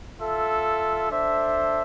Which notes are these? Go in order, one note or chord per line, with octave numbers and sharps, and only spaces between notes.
F4 A4 E5
D4 A4 C5 E5